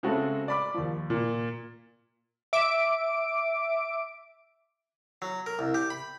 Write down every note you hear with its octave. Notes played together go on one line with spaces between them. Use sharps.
C#3 G#3 A3 C4 F#4 A4
D5 B5 D6
D#2 F3
A#2
E5 D6 D7
F#3
A#4
C2
G4
B5